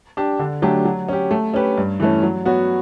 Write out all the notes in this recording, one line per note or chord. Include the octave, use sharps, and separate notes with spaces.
D4 G4
D3
F#3 A3 D4 G4
F#3
C#4 G4
A3
C#4 G4 B4
G2
E3 A3 C#4
F#3
B3 F#4 C#5